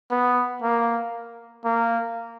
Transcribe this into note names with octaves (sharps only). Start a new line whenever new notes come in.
B3
A#3
A#3